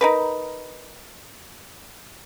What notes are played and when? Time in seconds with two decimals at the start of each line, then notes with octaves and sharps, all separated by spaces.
0.01 D#4 A#4 B4